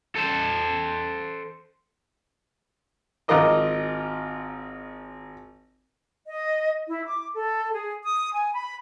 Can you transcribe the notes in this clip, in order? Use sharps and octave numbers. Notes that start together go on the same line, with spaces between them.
A4 C5
G#1 D#4 F4 A#4 D#5 D6
D#5
E4
D6
A4
G#4
D#6
G#5
B5